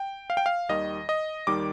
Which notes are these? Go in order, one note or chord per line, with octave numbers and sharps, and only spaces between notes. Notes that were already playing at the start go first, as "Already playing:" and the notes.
Already playing: G5
F5
G5
F5
D#2 D#3 G3 D#5
D#5
D#2 D#3 G3 D6